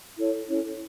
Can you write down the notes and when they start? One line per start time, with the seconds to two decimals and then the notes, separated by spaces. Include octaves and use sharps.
0.19 E4 A4 C#5
0.48 C#4 E4 A4 C#5